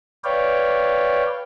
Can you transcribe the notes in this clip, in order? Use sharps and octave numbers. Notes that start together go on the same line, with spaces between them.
B4 C#5 D5 F5 G5